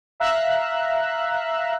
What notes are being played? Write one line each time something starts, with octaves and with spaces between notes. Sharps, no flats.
E5 F5 A#5 E6 F#6